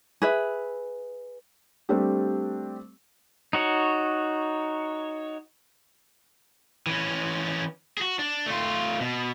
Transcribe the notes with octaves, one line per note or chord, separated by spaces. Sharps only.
G#4 B4 E5
G3 A3 C4 D4 G4
D#4 F#4 C#5
E3 C#4
F#4 G#4
D4
A3 F4
B2